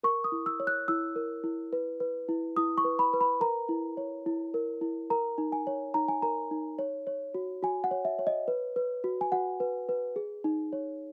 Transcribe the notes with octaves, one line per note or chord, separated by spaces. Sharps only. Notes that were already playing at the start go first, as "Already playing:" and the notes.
A#4 C#6
D#6
E4
E6
C#5
F#6
E4 E6
A#4
E4
B4
B4
E4
E4 D#6
C#6
B4
B5
B4
B5
A#4 A#5
E4
C#5
E4
A#4
E4
A#4 A#5
D#4
G#5
C#5
D#4 A#5
G#5
A#4 A#5
D#4
C#5
C#5
F#4
F#4 G#5
F#5
C#5
E5
C#5
D#5
B4
B4
F#4
G#5
F#4 F#5
B4
B4
G#4
D#4
C#5